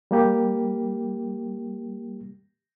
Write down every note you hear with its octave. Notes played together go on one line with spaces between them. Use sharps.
G3 A#3 G4